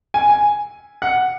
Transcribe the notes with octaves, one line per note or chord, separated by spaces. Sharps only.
G#5
G#5
F#5